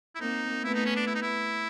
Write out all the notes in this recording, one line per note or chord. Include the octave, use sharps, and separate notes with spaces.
E4
A#3 C4 D#4
A3 B3 E4
D#4
C#4
D4
E4
D#4
E4